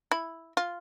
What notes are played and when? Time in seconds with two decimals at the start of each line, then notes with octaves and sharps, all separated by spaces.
0.11 E4
0.57 F4